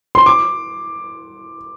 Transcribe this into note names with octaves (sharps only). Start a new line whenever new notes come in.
C6
D6